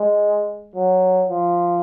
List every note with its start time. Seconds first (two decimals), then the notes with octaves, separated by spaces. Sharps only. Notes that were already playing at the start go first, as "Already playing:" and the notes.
Already playing: G#3
0.76 F#3
1.29 F3